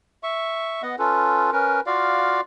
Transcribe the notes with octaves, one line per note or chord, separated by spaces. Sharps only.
E5 C#6
B3 D#5 F#5
C#4 F4 A4 B4
C#4 A#4 B4
F4 F#4 D5 F5